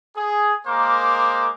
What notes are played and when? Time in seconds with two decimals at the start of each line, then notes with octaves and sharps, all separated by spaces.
0.15 G#4
0.67 G#3 A#3 A#4 C5 D6